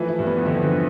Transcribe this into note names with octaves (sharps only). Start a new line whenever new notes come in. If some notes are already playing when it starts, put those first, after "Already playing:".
Already playing: E3 F3 A3
E4
G2
B3
E2
F2 D3
E2 F3